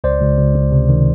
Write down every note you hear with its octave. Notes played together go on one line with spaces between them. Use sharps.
C#2 C5 D5
C#2
C#2
C#2
C3
D#3